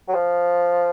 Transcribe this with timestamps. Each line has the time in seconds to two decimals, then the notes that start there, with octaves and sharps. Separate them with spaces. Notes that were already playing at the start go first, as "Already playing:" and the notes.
0.08 F#3
0.14 F3